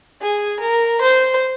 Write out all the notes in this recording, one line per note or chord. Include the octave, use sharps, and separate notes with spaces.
G#4
A#4
C5